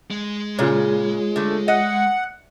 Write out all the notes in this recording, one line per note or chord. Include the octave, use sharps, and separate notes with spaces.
G#3
A#2 C#3 F4 G#4 C#5
D3 A3
D#5 F#5